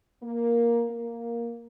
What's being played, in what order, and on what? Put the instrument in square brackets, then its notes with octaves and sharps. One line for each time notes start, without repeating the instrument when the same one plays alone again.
[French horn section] A#3
A#3